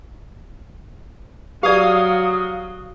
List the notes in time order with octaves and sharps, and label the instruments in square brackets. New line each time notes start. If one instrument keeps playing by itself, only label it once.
[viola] F#3 [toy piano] G4 D5 [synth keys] F5 D#6